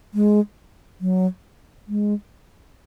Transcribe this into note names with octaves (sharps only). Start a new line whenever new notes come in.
G#3
F#3
G#3